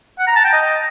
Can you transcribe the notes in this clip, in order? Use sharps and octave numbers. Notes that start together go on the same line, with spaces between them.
F#5
A#5
A5
G5
D#5